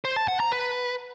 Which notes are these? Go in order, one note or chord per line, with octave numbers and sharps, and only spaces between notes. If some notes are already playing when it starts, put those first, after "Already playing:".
C5
A5
F#5
A#5
B4